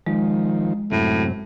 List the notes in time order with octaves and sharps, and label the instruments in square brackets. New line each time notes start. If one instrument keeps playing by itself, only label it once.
[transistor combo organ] D#3 F3 [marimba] G#3
[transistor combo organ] F#2 C3 [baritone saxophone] A2